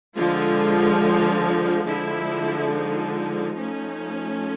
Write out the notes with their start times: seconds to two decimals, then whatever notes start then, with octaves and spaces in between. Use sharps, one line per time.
0.15 D3 F3 G#3 F4
1.86 D3 F3 G#3 E4
2.71 D#4
3.14 D#4
3.57 F3 A3 C#4